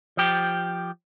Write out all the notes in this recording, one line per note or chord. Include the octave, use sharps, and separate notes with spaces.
F3 G4